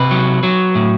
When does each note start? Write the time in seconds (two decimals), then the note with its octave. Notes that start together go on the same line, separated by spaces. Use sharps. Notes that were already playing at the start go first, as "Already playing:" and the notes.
Already playing: C3 B4
0.11 F#3
0.43 F#3
0.75 A2